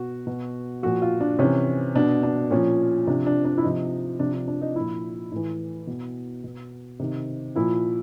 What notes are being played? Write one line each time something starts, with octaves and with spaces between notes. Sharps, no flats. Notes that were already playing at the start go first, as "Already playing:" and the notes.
Already playing: B2 F#4
B2
A#2 F3 F#4
F4
D4
C3 E3 C#4
B2 D4
D4
A#2 F3 C#4
C3 F3 D4
D4
D4
E4
C3 F3 D#4
C3 F3 D4
D4
D4
D#4
A#2 F3 E4
A2 E3
B2
B2
C3 D#3
A#2 F3 E4